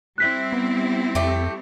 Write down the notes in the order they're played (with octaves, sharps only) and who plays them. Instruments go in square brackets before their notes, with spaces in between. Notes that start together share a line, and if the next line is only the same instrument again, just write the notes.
[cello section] G3 C4 E4 [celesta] F#6 B6
[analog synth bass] B3
[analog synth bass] F2 [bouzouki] A3 G4